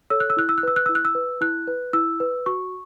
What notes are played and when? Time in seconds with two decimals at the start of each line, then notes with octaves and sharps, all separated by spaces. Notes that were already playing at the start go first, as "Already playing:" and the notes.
0.10 A4 C#5 E6
0.20 F#6
0.30 E6
0.37 E4 F#6
0.49 E6
0.58 F#6
0.63 B4 E6
0.76 F#6
0.86 E4 E6
0.95 F#6
1.05 E6
1.15 B4
1.41 E4 F#6
1.67 B4
1.93 E4 E6
2.20 B4
2.46 F#4 C#6